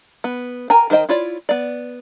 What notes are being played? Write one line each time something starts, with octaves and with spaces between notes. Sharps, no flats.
B3
A#4 G5 G#5 A#5
D#3 A#4 C5 D#5 G5
E4 F4 C#5 D5
B3 D5